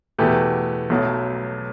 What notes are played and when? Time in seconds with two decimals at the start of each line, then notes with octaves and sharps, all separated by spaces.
0.18 E2 B2 A3 G4 B4
0.90 B1 B2 F#3 A3